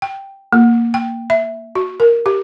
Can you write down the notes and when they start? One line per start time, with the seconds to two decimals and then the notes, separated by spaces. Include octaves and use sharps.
0.02 G5
0.53 A#3
0.94 G5
1.30 E5
1.75 F#4
2.00 A#4
2.26 G4